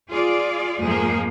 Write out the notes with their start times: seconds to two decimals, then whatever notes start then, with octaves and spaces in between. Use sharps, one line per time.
0.10 F4 G#4 D5
0.83 F2 G#2 F3 A#3 G#4